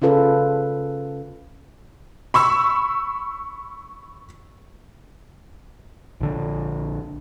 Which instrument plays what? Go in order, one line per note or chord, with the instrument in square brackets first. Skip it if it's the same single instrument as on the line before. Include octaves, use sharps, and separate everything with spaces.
[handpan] C#3 C#4 F4 A4 B4
[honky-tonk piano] B5 C#6 E6
[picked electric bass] A#1 D3